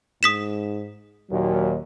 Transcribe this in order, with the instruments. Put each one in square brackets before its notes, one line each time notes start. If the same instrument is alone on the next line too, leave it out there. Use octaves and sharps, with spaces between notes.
[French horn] G#2 [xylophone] D#6 B6 E7
[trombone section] D#2 A#2 [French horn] F#3